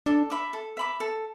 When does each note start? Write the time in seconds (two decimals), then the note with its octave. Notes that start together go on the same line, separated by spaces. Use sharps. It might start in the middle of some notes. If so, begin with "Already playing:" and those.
0.06 D4 A4
0.30 E5 B5 D6
0.53 A4
0.77 E5 B5 D6
1.00 A4